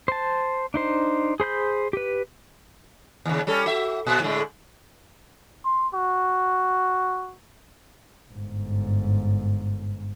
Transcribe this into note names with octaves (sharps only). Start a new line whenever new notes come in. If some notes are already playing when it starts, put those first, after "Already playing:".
C5 A5
D4 D#4 C5
G#4 C5 B5 G6
G4 B4
D#2 C#3
G3 C#4 A4
F#4 E5
A#2
A2 D3 G#3
C6
F#4
G1 G#2